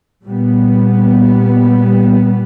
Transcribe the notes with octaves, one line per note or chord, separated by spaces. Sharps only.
A#2 G3 B3